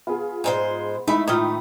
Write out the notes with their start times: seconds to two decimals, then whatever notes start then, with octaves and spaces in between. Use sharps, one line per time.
0.07 B3 F4 G#4
0.44 G#2 G#3 C5 D5 G#5
1.08 G#3 A3 D#4 E4 E5 B5
1.28 A2 D#3 F4 D#6 G#6